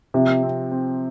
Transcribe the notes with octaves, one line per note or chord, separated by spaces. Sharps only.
C3 F3
C4
C4